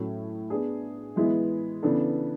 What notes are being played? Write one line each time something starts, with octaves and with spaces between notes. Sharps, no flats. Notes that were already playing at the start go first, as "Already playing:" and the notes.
Already playing: A2 F#3 A3 C#4
B3 D4 G#4
E3 G#3 B3 E4
C#3 E3 B3 D4 A4